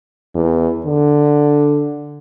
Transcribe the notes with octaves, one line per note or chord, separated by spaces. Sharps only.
E2
D3